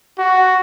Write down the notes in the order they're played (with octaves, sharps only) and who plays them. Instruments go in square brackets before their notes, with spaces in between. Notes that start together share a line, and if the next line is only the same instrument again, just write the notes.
[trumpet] F#4